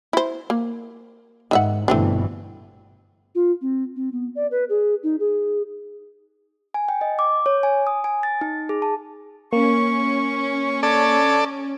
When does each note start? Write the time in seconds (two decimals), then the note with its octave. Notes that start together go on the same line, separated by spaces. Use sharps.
0.13 E4 C5
0.50 A#3
1.51 G#2 D#3 E5 F#5
1.88 G1 B2 E3 A3 C4 D4
3.35 F4
3.61 C4
3.96 C4
4.12 B3
4.36 D5
4.51 B4
4.69 G#4
5.03 D#4
5.20 G#4
6.74 G#5
6.89 G5
7.01 D#5
7.19 D6
7.46 C#5
7.63 G#5
7.87 D#6
8.04 G#5
8.23 A6
8.41 D#4
8.69 G#4
8.82 A5
9.53 A#3 C#4 C#6
10.83 A4 C#5 D5